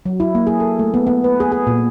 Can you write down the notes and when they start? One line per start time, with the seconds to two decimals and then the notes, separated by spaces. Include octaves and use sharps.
0.06 F#3
0.20 E4
0.35 A#3
0.47 G#4
0.60 A4
0.79 A3
0.94 B3
1.07 B3
1.24 B4
1.40 G#4
1.52 G#4
1.67 A#2